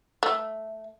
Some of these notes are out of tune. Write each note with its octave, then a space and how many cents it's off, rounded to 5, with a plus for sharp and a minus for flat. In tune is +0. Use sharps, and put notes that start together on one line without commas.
A3 -5